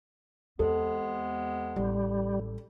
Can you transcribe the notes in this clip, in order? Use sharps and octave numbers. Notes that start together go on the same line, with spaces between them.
E2 C3 G#3 B3 A4
A1 G3